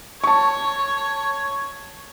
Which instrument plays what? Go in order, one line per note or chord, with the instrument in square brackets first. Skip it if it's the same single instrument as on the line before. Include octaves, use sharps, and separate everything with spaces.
[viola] C#5 [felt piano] A5 C#6